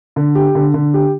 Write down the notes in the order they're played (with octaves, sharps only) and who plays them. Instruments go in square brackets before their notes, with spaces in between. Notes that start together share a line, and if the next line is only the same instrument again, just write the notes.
[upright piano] D3
G4
D3
D3
G4